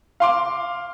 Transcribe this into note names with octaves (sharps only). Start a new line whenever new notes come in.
F5 C6 D6